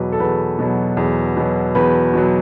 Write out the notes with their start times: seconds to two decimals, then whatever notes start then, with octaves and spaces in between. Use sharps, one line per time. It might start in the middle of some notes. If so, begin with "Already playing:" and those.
Already playing: E2 B2 F#3 B4
0.12 A4
0.20 E2 B4
0.59 B2 F#3
0.97 E2
1.37 B2 F#3
1.75 E2 B4
2.14 B2 F#3